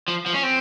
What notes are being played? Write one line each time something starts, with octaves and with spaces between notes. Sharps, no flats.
F3
F3
C#4
C4